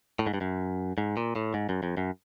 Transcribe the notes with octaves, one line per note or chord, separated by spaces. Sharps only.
A2
G#2
G2
F#2
G#2
A#2
A2
G#2
F#2
F2
F#2